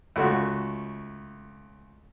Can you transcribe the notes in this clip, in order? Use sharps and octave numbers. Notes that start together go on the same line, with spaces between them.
C#2 A3 F#4